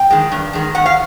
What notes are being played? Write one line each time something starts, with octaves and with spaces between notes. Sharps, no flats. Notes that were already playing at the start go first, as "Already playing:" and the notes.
Already playing: G5
D#3 G#3
G2
D#3 G#3
D#3 F#5
F5